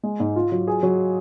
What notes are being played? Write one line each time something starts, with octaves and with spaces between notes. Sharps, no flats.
G#3
G#2
F4
F#3
G#4
F#3